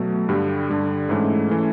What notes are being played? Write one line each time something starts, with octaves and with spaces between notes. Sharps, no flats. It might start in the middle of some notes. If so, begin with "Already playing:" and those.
Already playing: B2 F#3 A3
G2 D3 G3
G2 D3 G3
G#2 E3 A3 C#4
E3 A3 C#4